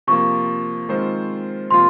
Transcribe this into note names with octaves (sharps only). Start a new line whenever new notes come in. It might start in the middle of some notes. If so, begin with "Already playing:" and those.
C3 F3 A#3 C#6
D#3 G#3 C4 F4 C5
C3 F3 A#3 F4 C6